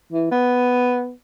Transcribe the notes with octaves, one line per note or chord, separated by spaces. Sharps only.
E3
B3